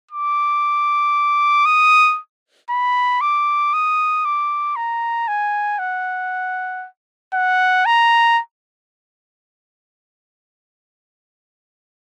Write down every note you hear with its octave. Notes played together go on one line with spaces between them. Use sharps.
D6
D#6
B5
D6
D#6
D6
A#5
G#5
F#5
F#5
A#5